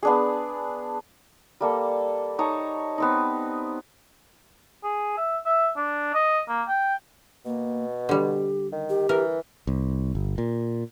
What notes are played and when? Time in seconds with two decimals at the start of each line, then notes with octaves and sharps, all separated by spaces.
0.03 B3 D4 G#4
1.61 G3 A#3 A4
2.39 D#4 C#5 A5 A#5
2.98 B3 C4 D#4
4.83 G#4
5.17 E5
5.45 E5
5.77 D4
6.14 D#5
6.49 A#3
6.68 G5
7.46 B2 A#3
8.09 D3 G3 G4
8.72 D#3
8.89 G4
9.09 E3 A#4
9.67 C2
10.15 G1
10.38 A#2